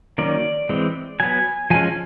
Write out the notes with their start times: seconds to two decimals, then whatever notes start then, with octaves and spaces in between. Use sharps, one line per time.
0.18 D#3 F#3 A#3 C#4 D5
0.69 E3 G#3 C4
1.20 F#3 B3 G#5
1.70 F3 G#3 C#4 G#5